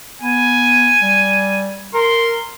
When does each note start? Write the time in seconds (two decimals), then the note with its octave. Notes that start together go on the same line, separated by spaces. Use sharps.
0.21 B3 G#5
1.02 G3
1.94 A#4 C6